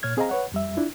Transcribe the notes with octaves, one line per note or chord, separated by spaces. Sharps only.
A#2 C#5 F6 G#6
C4 G#4 C5 D#5 F5 A#5
B4 C#5 F#5
F2 G3 E5
D4 E4 F4